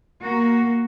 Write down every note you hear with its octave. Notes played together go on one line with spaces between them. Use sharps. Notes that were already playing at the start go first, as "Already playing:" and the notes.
A#3 F#4